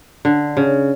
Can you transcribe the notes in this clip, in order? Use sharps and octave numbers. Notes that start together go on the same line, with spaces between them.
D3
C#3